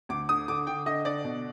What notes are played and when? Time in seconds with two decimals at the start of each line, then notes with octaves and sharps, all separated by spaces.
0.09 D2 D6
0.29 D3 D#6
0.48 D3 D6
0.67 D3 G5
0.86 D3 D#5
1.05 D3 D5
1.24 B2